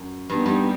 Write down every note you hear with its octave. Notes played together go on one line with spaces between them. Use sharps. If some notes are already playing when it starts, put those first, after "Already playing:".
Already playing: F#2
G2 A#2 G3 B3 D#4
G2